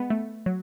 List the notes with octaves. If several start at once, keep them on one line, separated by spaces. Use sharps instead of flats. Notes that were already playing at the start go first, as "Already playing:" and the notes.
Already playing: G#3 B3
A3
F#3